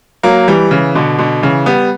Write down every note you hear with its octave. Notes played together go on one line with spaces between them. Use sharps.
F#3 A#3
E3 G3
C#3 E3
B2 D3
B2 D3
C#3 E3
G3 B3